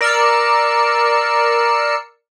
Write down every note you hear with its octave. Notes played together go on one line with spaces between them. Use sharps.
A#4 D5 E6 C7 C#7